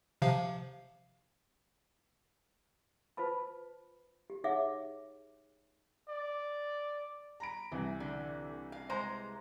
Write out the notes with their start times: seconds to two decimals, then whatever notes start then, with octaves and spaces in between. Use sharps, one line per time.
0.22 C3 F3 F5
3.17 F4 B4 C5 A5 B5
4.30 G4
4.44 D#4 G#4 C#5 E5 F#5 D6
6.10 D5
7.40 A#5 B5 D7
7.72 C2 E3
8.00 D3
8.72 F5
8.90 G#3 C5 A#5